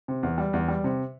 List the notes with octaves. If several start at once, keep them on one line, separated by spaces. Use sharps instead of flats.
C3
E2
G3
E2
G3
C3